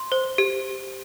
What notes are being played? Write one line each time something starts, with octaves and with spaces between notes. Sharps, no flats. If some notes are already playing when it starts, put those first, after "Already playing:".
Already playing: C6
C5
G4